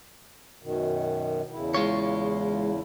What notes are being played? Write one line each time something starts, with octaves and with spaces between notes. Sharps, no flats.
F#2 B2 D#3
E2 C#3 E4
G#3 F4 C#5